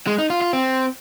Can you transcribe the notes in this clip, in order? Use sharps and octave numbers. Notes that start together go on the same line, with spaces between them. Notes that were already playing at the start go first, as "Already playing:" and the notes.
G#3
D#4
F4
F4
C4